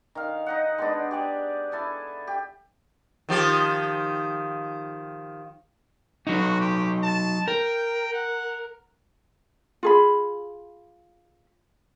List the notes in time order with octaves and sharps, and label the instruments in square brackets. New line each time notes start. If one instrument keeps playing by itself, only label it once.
[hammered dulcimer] D#3 F5
D#4 D#5 F#5
G#3 B3 D4
G4 G#4 D5
E4 A4 G#5 A5
G4
[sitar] D#3 F3 G4
[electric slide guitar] F#3 D#4 [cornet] F#4
[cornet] G4
A5
[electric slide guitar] A#4 [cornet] G5
[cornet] F#5
[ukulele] F4 G#4 B5